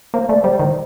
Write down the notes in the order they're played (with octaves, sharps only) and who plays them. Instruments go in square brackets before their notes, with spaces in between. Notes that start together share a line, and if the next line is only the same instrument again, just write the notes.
[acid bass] A#3 [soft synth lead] C5
[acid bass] A3 [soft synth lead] D5
[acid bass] G3 [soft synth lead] C5
[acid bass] D#3 [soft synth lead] C5